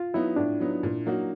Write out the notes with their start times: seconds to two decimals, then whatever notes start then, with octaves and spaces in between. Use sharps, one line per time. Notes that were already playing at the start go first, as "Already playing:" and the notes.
Already playing: F4
0.13 F#3 B3 D#4 E4
0.36 A2 D4
0.60 F#3 B3 D#4
0.83 A#2
1.06 F#3 A#3 D#4 F#4